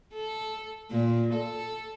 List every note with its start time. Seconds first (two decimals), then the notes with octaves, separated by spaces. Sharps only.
0.13 A4
0.90 A#2
1.33 A4